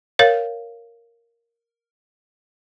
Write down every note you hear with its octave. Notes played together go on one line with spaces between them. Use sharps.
A#4 C#5 F5